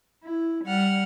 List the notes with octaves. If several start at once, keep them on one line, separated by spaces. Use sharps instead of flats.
E4
G3 F#5 F6